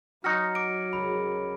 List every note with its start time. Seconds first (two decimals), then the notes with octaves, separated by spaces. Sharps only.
0.24 F#3 D#4 F#4 F6 A#6 C#7
0.55 D6 D7
0.93 C#2 A#4 B5